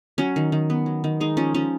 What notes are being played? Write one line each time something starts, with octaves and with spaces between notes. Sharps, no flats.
F#3 C#4
D#3
D#3
B3
F#3
D#3
G#3 D#4
F3 C#4
F3 C#4